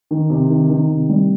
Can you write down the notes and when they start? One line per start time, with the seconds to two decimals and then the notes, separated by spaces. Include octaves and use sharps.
0.11 D#3
0.30 C3
0.50 D#3
0.69 D#3
0.89 C3
1.09 G3